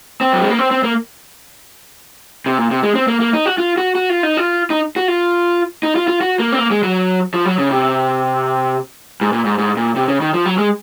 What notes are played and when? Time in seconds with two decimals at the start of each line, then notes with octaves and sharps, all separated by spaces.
0.21 C4
0.33 F#3
0.41 G#3
0.50 A#3
0.58 C4
0.71 C4
0.84 A#3
2.46 C3
2.58 A#2
2.71 C3
2.83 G#3
2.95 C4
3.08 A#3
3.20 A#3
3.33 D#4
3.46 F#4
3.58 F4
3.78 F#4
3.95 F#4
4.10 F4
4.23 D#4
4.37 F4
4.70 D#4
4.96 F#4
5.08 F4
5.83 D#4
5.96 F4
6.08 F4
6.21 F#4
6.40 A#3
6.52 C4
6.58 A#3
6.71 G#3
6.83 F#3
7.34 F3
7.45 F#3
7.58 C#3
7.71 C3
9.21 G#2
9.33 A#2
9.45 G#2
9.58 G#2
9.77 A#2
9.96 C3
10.08 C#3
10.21 D#3
10.33 F3
10.45 F#3
10.58 G#3